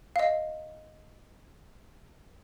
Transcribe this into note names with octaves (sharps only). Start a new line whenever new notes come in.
D#5 F5